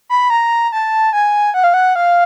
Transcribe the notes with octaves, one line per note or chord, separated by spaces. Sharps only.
B5
A#5
A5
G#5
F#5
F5
F#5
F5